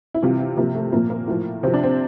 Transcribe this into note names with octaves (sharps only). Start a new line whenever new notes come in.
E4
C3 E3 G3 F4
E4
C3 F3 A#3
A3
A#2 F3 A#3
A#3
A2 F3
C3 F3 C4
D4
C4